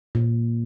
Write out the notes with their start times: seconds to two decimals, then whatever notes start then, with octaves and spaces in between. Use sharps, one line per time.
0.15 A#2